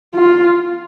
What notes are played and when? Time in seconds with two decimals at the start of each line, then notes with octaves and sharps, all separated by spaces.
0.15 F4